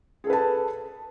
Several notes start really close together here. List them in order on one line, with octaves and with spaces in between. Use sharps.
G#4 A4 B4 A5